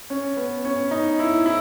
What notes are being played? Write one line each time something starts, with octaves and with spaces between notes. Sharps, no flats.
C#4
B3
C#4
D#4
E4
E4